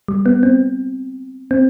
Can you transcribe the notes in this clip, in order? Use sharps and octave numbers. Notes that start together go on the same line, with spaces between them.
G3
B3
C4
C4